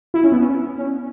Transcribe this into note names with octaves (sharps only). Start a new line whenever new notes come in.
E4
C#4
B3
C#4
C#4